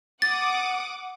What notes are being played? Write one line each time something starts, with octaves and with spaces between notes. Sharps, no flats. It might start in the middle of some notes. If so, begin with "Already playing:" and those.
F#5 D6 D#6 A6